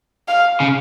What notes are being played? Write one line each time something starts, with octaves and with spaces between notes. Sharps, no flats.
F5
C#3